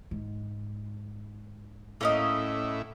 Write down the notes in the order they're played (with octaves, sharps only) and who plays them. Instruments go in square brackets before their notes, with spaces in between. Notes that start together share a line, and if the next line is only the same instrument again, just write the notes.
[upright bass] G#2
[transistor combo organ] A2 E4 [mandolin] A#3 C#4 D#5